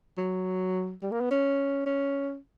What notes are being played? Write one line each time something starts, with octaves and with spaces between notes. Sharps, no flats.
F#3
G3
A#3
B3
C#4
C#4